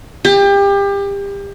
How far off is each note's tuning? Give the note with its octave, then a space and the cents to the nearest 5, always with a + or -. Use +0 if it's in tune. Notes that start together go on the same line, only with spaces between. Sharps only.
G4 +30